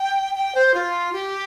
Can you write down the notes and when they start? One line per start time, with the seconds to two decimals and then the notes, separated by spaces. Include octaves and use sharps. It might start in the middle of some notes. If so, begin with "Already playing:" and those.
Already playing: G5
0.35 G5
0.55 C5
0.74 F4
1.13 G4